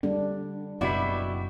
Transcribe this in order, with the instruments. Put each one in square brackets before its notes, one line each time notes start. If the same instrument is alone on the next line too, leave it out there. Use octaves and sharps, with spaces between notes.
[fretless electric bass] D3 [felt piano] G3 [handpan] D4
[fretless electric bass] F#1 B2 [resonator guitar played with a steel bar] G3 E4 F#4 [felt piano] D6 B6